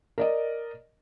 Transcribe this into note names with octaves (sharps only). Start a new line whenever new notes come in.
A#4 D5 D#5